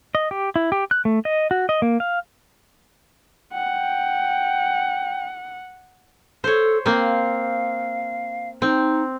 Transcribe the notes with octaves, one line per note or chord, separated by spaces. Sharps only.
D#5
G4
E4
G4
F#6
A3
D#5
F#4
D#5
A#3
F5
F#5 G5
A4 C5 C#5
A#3 C4 F5
C4 D#4